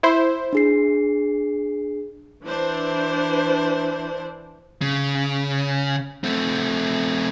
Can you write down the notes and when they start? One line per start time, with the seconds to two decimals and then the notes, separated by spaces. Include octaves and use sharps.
0.03 E4 C5
0.53 D4 G#4 C7
2.44 E3 D4 C5
4.82 C#3
6.24 A3 C4